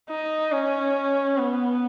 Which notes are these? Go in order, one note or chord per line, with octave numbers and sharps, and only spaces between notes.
D#4
C#4
B3